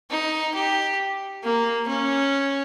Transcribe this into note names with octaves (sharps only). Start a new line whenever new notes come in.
D#4
G4
A#3
C#4